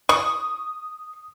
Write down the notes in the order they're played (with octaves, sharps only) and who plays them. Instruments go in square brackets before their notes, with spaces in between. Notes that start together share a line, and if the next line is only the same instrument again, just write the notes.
[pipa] C#6 [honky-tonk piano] D#6